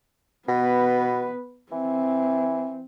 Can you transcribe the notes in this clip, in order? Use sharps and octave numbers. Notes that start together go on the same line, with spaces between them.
B2 B3 B4
E3 C4